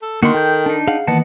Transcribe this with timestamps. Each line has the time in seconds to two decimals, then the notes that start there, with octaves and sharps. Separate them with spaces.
0.03 A4
0.23 D3 D#3 A#3 F#4 C6
0.34 A4 G5 G6
0.66 D4 D#4
0.87 G#4 F5 F#5
1.07 D#3 E3 A#3 B3 D#5 F#5 A5